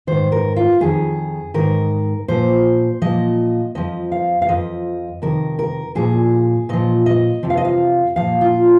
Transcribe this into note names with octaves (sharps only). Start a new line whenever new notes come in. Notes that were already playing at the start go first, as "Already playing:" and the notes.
G#2 D#3 C5
A#4
F4
F2 D#3 G#4
G#2 D#3 A#4
A#2 F3 C5
A#2 F3 D#5
F2 F3 D#5
F5
F5
F2 F3 D#5
F2 C3 D#3 A#4
A#4
A#2 F3 G#4
A#2 F3 D#5
D#5
F2 C3 F3
F5
D#5
F5
A#2 F3 F5
F4